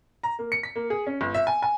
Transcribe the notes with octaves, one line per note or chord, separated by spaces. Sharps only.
A#5
A#3
C#7
B6
A#3
G#4
C#4
G1
E5
G#5
G#5